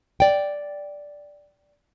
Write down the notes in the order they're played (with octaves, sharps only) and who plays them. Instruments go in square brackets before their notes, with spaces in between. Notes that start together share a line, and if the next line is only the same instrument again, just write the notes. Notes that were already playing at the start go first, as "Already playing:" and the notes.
[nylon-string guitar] D5 G5